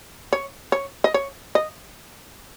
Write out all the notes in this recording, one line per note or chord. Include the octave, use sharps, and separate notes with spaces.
C#5
C#5
D#5
C#5
D#5